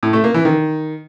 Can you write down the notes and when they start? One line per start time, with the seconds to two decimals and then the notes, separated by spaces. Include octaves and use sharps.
0.03 A2
0.13 A3
0.24 A#3
0.34 E3
0.45 D#3